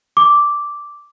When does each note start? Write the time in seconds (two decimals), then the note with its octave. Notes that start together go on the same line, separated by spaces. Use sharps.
0.17 D6